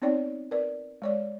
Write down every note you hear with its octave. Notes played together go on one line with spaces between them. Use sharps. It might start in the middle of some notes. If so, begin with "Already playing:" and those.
B3 C4 D#4 C#5 D5 G5
A#4 B4 D5
G#3 C#5 D5